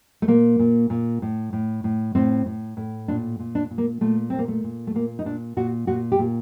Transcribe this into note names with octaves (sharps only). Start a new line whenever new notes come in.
A3
A#2 A#3
A#2
A#2
A2
A2
A2
A2 C4
A2
A2
A#2 D4
A#2
D4
A#2
A#3
A#2 A3
A#2 C4
A#3
A3
A#2
A3
A#2 A#3
D#4
A#2 D4
A#2 F#4
A#2 F#4
G4
A#2